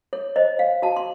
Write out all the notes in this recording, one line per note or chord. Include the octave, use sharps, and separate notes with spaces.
C#5
C5 D#5
F5
F#4 A5
C6